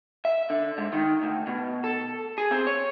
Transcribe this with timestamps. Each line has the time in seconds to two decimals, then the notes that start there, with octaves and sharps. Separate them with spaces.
0.25 E5
0.50 D3
0.78 G#2
0.93 D#3
1.23 D2
1.47 B2
1.84 A4
2.38 G#4
2.51 C4
2.67 C#5